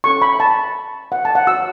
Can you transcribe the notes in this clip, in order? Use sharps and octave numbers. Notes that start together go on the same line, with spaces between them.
C#4 A4 C#5 C#6
B5
A5
F#5
A5
F#5
F#4 C#5 E6